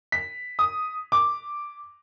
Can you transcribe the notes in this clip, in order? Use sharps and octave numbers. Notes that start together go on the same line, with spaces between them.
B6
D#6
D6